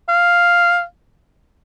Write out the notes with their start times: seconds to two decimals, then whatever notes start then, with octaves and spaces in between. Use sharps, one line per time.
0.09 F5